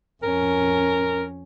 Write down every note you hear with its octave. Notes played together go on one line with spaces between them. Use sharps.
F2 C#4 A#4